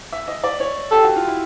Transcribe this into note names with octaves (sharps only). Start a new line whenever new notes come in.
E5
D#5
D5
C#5
G4 A4
F#4
F4
E4